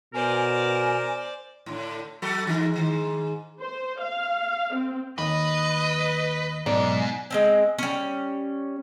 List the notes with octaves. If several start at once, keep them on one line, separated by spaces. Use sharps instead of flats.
B2 A#4 C5 D5 G#5
A2 D3
F#3 F#4 A4
G#2 E3 D#4
G#2 D#3
C5
F5
C4
D#2 B4 D#5
B1 G#2 D5
G#3 A#3 C4
G3 C#4